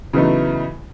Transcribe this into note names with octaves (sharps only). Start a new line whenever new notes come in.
C#3 E3 F#3 A3 B3 D#4